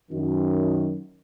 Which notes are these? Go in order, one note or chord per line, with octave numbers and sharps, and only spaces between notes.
F#2 D#3